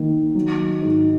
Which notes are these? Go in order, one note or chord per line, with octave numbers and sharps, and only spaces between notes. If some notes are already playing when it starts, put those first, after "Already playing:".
Already playing: D#3 A#3
F#3
G#2